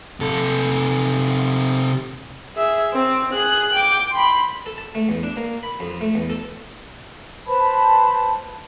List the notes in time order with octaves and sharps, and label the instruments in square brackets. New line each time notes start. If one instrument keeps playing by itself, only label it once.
[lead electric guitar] C3 A4
[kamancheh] G#4 E5
C4
G#4 F#6
G5 D6
B5 C6
[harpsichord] A4
A5
A3
E2
D4
A#3
B5
F2
A3
E2
A4
[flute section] B4 C5 A5 B5